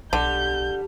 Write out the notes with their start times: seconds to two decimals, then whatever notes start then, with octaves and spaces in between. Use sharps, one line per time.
0.13 B1 D3 G3 G6